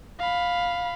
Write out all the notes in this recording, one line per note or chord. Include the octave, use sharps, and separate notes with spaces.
F5 B5